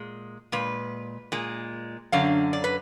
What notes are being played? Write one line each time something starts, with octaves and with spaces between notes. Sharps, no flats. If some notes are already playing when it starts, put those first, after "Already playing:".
Already playing: A#2 G#3
A#2 G#3 B4
A#2 G#3
F#2 D3 F#3 F5
D5
B4